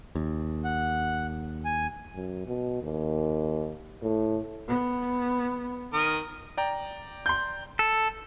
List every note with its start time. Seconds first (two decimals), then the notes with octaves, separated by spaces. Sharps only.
0.15 D#2
0.64 F#5
1.65 G#5
2.15 F#2
2.46 B2
2.83 D#2
4.02 A2
4.68 B3
5.94 D#3 A#4 D#6
6.57 D5 G5 A#5
7.26 C6 G6
7.79 A4